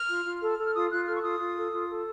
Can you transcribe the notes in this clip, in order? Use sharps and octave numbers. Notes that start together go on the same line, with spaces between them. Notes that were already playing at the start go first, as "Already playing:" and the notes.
Already playing: F6
F4
F4
A4
A4
F6
F4 D#6
F4 F#6
A4 F6
C#6
F4 D#6
F4
A4
F4
A4